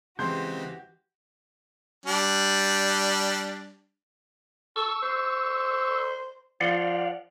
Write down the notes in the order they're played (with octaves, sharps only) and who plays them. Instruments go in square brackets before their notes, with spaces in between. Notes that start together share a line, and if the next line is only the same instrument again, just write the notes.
[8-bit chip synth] C#3 G#3 C4 [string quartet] E3 F#4 G4 [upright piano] C6 G6
[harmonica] G3 D4
[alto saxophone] A4 [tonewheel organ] C#6 E6
[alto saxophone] C5
[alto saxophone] F3 [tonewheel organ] D5 F5 F#5